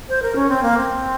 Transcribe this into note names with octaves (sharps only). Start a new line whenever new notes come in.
C5
A#4
C#4
C4
A#3
C4